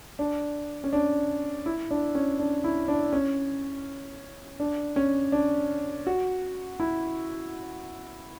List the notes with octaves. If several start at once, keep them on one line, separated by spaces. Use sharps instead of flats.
D4
C#4
D4
E4
D4
C#4
D4
E4
D4
C#4
D4
C#4
D4
F#4
E4